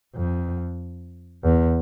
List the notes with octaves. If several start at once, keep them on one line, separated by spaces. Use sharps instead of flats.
F2
E2